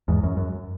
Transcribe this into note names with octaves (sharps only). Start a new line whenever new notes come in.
E2 G#2
F#2
F#2